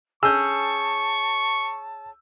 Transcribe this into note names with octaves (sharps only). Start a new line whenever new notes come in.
C#4 G#4 A5 C#6 E6 G6